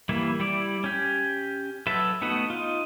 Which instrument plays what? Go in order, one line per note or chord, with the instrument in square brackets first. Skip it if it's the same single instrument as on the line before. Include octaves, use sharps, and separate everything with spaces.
[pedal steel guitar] E3 G3 A#3 E4
G3 E4 D5
C#4 G4
F#3 A4 B4 E5
A3 B3 D#4 F#4
D#4 F4